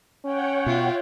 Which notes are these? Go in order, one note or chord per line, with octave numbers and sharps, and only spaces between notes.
C#4 C#5 F#5 G5
B2 F4 E5